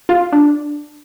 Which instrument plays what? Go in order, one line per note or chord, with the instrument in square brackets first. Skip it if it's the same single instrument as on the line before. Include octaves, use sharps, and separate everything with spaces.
[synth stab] F4
D4